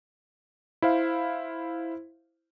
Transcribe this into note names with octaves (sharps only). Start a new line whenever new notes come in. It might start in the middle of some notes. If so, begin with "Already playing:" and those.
E4 C5 F5